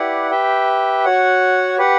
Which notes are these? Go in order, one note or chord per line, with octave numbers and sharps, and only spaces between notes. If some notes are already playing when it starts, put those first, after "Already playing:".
Already playing: E4 G4 B4 D5 F#5
G4 B4 E5 G5
F#4 C#5 F#5
G4 B4 F#5